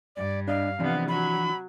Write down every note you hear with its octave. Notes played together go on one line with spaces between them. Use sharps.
G2 D5
D4 D#5 F5
C3 E3 F3 B3 D4
F#3 B5